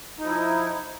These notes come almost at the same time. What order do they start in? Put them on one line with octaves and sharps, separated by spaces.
D#4 F3 E4